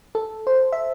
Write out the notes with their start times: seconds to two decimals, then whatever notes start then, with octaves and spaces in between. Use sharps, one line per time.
0.15 A4
0.47 C5
0.72 E5